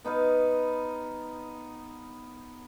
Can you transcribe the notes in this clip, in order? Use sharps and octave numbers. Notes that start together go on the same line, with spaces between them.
B3 D#4 B4 F5